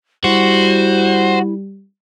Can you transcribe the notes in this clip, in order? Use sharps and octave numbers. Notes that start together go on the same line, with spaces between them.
G3 E4 F#4 C5